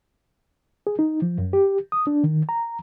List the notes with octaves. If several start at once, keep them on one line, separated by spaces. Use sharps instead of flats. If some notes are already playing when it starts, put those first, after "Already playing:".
G#4
D#4
F3
F#2
G4
D#6
D4
D#3
A#5